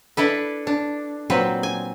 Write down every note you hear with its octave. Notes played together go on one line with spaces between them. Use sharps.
D4 E4 A4 B4
D4
A#2 F#3 C4 B4
G#5